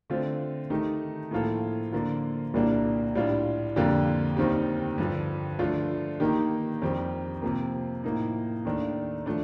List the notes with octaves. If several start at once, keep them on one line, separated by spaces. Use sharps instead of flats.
D3 A3 C4 F4
D#3 A3 D#4 G4
A2 F3 A#3 F4 A4
D3 F3 A#3 F4
C2 A#2 G3 A#3 D4
A2 G3 D4 F4
F2 D3 G3 A#3 F4
D#2 D#3 G3 C4 G4
G2 D3 F3
D3 F3 A3 D4 F4
D#3 A#3 D#4 G4
F2 D#3 G3 C4 G4
C3 F3 A#3
A2 F3 A#3 D#4
D#2 D#3 A3 D4
F3 A3 D4